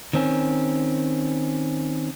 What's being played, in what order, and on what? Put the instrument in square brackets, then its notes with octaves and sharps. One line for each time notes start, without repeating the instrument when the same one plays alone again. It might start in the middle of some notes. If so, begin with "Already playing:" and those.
[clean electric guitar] D#3 C4 C#4